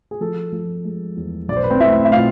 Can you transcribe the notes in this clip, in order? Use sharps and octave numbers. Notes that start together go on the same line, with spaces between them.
G#4
F3 A4
F3
G#3
E2
B1 D5
C5
B4
C4 C5
A3 E4 E5
E5
B2 F4 F5